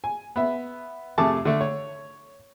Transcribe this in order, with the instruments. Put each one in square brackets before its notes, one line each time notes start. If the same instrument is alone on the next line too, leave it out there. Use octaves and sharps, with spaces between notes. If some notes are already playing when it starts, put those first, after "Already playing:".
[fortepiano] G#5
B3 E5
F2 C3 A3 G#4 A5 D6
D3 A3
C#5